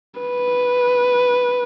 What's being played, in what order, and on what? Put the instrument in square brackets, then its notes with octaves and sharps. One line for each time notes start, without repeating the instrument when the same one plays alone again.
[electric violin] B4